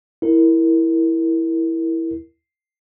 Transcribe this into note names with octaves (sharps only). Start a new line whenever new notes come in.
E4 A#4